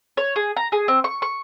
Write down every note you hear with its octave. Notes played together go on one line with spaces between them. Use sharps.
C#5
G#4
A#5
G#4
C4
C#6
C#6